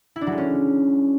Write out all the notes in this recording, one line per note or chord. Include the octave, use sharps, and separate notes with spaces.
E4
D4
F#3
G#3
C#4